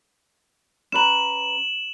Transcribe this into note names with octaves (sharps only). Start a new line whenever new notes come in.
C#4 B4 A#5 E7 F#7